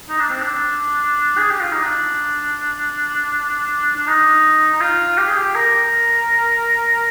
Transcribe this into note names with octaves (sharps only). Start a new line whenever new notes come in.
D#4
D4
C4
D4
G#4
G4
F4
D#4
D4
D4
D#4
D#4
F4
G4
G#4
G4
A#4